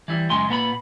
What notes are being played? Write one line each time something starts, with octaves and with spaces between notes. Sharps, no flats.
E3 G3 E4
F#2 C#3 G#3 G#5 C6
A#2 B3 A#4 B5